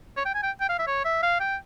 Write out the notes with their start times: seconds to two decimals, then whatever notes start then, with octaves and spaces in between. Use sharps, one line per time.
0.17 C#5
0.26 G5
0.35 G#5
0.43 G5
0.61 G5
0.69 F5
0.79 E5
0.87 C#5
1.05 E5
1.23 F5
1.40 G5